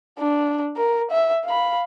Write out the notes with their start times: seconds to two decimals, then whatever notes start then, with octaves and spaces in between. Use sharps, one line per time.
0.19 D4
0.76 A#4
1.11 E5
1.45 F5 B5